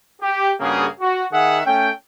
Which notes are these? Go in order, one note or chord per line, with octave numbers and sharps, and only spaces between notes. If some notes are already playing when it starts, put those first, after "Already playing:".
G4
G2 C#3 A#3 F#4 G#4
F#4
D#3 G#4 E5 F#5
A3 C#4 G5